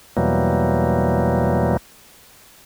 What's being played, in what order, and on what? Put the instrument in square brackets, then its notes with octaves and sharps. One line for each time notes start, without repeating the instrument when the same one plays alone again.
[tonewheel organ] E2 B2 E3 F#3 G3 A#3